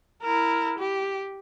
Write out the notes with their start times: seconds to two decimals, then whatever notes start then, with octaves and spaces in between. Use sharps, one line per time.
0.22 E4 A#4
0.79 G4